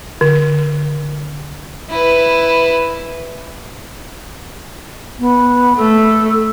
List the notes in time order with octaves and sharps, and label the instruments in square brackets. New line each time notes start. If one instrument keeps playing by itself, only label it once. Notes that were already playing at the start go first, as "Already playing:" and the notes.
[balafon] D3
[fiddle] E4 B4
[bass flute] B3
[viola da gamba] A3 [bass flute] A4